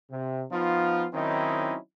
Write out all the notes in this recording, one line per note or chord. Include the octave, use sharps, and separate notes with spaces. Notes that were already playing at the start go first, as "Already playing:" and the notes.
C3
F3 B3 D#4 F4
D#3 F#3 C4 C#4 D#4 E4